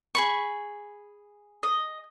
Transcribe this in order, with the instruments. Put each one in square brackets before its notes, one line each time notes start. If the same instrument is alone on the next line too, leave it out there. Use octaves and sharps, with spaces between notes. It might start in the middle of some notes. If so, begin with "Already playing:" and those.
[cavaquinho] G#4 B5 C#6
[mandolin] D#5